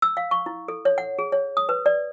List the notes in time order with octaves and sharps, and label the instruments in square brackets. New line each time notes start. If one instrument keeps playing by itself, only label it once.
[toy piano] E6
F5
C#6
E4
A4
C#5
F#5
G#4
C#5
D#6
B4
D5